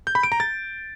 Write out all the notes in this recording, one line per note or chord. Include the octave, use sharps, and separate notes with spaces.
G6
B5
D7
A#5
A6